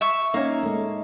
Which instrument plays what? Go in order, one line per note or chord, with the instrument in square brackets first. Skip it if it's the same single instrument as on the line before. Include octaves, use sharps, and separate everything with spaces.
[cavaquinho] E5 C#6
[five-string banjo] A#3 C#4 [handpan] D#4
[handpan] G#3 A3